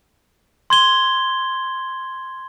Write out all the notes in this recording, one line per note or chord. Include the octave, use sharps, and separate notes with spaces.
C6 G#6 G7